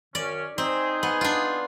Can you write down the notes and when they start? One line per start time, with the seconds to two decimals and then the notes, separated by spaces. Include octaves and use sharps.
0.15 F#2 D#3 C#4 D5
0.58 C4 D#4 G#4
1.03 B3
1.21 D4 F4